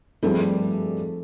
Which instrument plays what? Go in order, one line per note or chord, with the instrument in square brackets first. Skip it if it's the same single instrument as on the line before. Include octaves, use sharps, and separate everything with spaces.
[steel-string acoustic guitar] G2 G3 [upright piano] F3 A3 C4 D#4 G#4